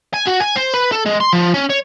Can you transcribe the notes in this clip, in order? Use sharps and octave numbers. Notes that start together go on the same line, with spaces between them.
G#5
F#4
G#5
C5
B4
A4
G#3
C6
F3
C#4
C#5